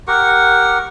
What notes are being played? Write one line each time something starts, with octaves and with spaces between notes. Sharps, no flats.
G4 A#4 F#5 C#6